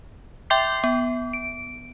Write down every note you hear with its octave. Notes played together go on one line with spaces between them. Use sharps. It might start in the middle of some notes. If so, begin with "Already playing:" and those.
E5 G5 C6 D6 G6 C7
B3
D7